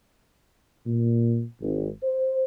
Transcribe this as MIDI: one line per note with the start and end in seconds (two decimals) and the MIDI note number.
0.86 1.43 46
1.61 1.88 32
2.03 2.43 72